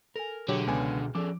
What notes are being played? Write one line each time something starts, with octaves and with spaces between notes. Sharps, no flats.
A4 A#4 G#5
B2 D3 F#3 G4 G#4 C#5 D6
C#2 B3 G#5
F6
F3 C#4 G#4 A4 D6